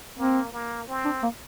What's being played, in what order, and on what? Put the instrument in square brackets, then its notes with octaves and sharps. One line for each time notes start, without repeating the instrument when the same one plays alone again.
[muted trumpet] A#3 [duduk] C4
[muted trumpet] A#3
C4
[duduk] D4
A#3